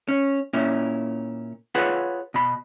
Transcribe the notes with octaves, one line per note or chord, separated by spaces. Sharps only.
C#4
A#2 C#4 E4
F4 G#4 B4 C#5 F#5
B2 B5